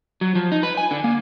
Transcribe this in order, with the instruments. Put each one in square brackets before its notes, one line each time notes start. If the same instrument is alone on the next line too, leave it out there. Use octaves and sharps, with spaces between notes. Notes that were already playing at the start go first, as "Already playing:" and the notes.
[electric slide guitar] F#3
F3
D#4
B4
G#5
D3
A#3